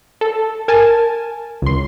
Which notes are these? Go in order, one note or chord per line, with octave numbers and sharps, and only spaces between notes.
A4
A#4 G#5 A5
C#2 C6